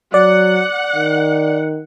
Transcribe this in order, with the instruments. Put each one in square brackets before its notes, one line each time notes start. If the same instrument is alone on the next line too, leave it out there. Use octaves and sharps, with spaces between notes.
[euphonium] F#3 [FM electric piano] D5 [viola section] F#5
[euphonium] D#3